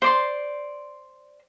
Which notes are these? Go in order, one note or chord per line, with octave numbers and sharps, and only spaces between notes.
C5 D5 C6